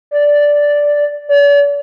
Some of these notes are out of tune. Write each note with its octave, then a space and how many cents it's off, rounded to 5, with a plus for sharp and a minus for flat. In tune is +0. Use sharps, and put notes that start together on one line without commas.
D5 -5
D5 -45